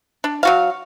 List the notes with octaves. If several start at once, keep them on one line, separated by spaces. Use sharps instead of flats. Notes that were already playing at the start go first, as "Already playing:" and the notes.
D4
F#3 F#4 F5